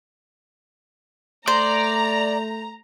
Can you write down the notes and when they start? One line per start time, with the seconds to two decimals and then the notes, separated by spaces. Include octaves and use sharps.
1.47 A3 C5 D5 A#5